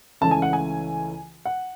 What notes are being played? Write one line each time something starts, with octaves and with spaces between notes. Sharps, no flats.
C#2 C#3 E3 A3 A5
G#5
F#5
G#5
F#5